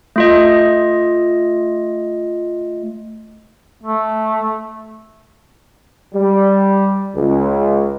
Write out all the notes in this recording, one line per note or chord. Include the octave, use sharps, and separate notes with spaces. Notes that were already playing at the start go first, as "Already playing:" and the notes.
A3 F4 D#5
A3
G3
C#2